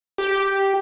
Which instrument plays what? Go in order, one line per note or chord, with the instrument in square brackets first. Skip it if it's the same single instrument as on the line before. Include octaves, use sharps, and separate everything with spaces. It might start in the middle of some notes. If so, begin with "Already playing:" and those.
[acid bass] G4